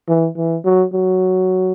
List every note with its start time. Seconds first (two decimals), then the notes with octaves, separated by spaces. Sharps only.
0.08 E3
0.37 E3
0.65 F#3
0.94 F#3